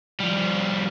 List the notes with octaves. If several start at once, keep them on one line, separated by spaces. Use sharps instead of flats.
F3 G3